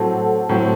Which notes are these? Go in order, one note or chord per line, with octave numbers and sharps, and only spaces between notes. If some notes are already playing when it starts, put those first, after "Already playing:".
Already playing: A2 F#3 C4 F#4 A4
A2 F#3 C4